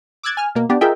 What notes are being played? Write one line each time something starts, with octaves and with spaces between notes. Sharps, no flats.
D6 E6 F#6 G#6 A6
G#5 F6
B2 A#3
B3 D4 G4
F4 G#4 A#4 D#5 E5 G5